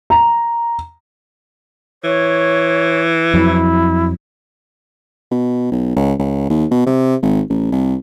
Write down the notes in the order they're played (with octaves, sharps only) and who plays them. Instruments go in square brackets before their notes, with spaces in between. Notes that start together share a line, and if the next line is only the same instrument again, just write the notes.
[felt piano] A#5
[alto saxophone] E3 [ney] C#5
[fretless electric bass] F2 F#3 [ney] E4
[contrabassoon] B2
B1
C#2
C#2
D#2
B2
C3
G#1
A1
C2